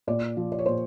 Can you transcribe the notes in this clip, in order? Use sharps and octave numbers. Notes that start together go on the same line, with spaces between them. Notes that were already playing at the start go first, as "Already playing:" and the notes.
A#2 D5
F3
D5
C#5
A#2 C5